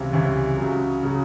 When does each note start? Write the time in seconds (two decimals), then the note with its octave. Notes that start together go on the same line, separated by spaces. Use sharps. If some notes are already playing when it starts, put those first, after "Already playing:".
Already playing: C#2 C3 E3 G3
0.13 C#2 C3 E3 G3
0.57 C#2 C#3 F#3
1.03 C#3 F#3